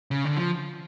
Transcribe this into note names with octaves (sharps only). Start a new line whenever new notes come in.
C#3
D3
F3